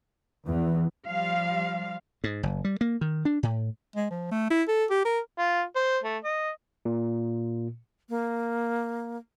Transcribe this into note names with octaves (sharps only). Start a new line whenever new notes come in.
E2 E3
F3 G3 F5
G#2
F#1
G3
A#3
D#3
D4
A2
G#3
F3
A3
E4
A4
G4
A#4
F4
C5
A3
D#5
A#2
A#3